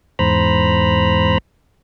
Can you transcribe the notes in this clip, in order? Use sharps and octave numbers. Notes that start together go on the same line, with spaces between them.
E2 G#2 C5 A#5 B5